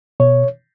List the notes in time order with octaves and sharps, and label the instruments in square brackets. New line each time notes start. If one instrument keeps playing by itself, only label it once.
[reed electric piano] B2 C#5